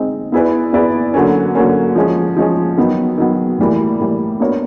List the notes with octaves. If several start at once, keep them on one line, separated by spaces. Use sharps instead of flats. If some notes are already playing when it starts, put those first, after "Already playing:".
Already playing: G#3 C4 D#4
B3 E4 G#4 B4 D5
B3 E4 G#4 B4 D5
D3 F#3 A#3 C#4
D3 F#3 A#3 C#4
F3 G#3 C#4
F3 G#3 C#4
D#3 F#3 B3
D#3 F#3 B3
A2 E3 G3 A#3
A2 E3 G3 A#3
B3 D4 F#4 A#4 C#5